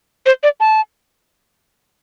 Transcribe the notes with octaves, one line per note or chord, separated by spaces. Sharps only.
C5
D5
A5